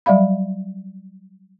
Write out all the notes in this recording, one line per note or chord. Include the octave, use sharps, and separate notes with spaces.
F#3 G3 D5 E5 F5 B5